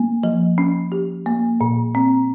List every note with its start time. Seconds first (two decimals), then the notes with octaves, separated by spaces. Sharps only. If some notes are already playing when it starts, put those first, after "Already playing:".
Already playing: A#3
0.24 F3
0.58 C#4
0.92 G4
1.26 A#3
1.61 A#2
1.95 C4